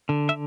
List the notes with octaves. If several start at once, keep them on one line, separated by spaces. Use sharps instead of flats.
D3
E5